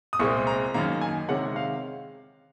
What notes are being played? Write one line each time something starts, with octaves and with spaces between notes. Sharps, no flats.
D#6
C2 A#2 G#3 C4 C#6
A#5
F#2 D#3 A#3 A#5
G#5
C3 D#3 G#3 C#4 F#5
F5